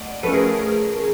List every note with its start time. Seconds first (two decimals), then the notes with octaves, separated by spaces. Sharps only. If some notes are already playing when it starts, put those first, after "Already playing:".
Already playing: A3 D5 D#5 F#5
0.23 F3 A3 C#4 A4 B4
0.33 G#4 A#4